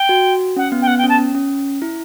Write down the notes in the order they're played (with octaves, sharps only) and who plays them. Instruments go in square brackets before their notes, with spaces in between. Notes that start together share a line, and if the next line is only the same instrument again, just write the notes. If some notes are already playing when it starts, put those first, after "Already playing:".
Already playing: [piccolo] G5
[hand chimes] F#4
[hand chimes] C#4 [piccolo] F#5
[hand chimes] B3
[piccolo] G5
[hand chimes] B3 [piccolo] F#5
[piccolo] G5
[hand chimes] C#4
[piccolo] A5
[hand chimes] C#4
C#4
E4